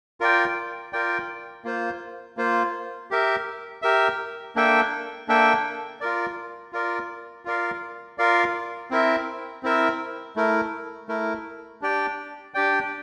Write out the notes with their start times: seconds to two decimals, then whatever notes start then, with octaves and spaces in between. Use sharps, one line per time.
0.20 F4 A#4 D5 G5
0.93 F4 A#4 D5 G5
1.64 A#3 F4 C5
2.37 A#3 F4 C5
3.11 G4 A#4 E5
3.82 G4 A#4 E5
4.56 A#3 D4 A4 E5 G5
5.28 A#3 D4 A4 E5 G5
6.01 F4 A#4 D5
6.73 F4 A#4 D5
7.45 F4 A#4 D5 F5
8.18 F4 A#4 D5 F5
8.91 C4 E4 A#4 E5
9.63 C4 E4 A#4 E5
10.36 A3 E4 A#4
11.08 A3 E4 A#4
11.81 D4 G4 D5 G5
12.54 D4 G4 D5 G5